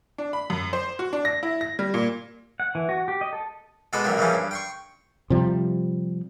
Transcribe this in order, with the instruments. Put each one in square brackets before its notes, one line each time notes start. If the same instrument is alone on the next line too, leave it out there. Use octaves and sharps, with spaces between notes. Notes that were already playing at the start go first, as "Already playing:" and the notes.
[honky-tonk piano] D4
B5
F#2
C5
F#4
D4
A#6
E4
A#6
G3
A#2
[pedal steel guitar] F#5
E3
F#4
G4
D#5
A4
[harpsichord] B2 G#3 A4 B4 B5 D6
A1 F#3 A#3 G4
A#2 C#3 E3 F3 G3 C#4
G2
G5 C6 C#6
[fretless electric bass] C3 F3 G3